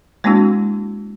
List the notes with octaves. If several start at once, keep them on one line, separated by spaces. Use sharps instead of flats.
G#3 A#3 C4 D4 E4 F#4